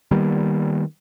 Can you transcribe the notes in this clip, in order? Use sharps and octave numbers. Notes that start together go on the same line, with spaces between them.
D#3 G3 A#3 B3